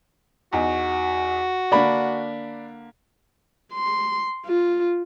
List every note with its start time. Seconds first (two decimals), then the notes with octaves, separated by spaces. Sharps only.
0.53 E2 D#4 F#4
1.72 D3 A#3 D4 B5
3.73 C6
4.46 F4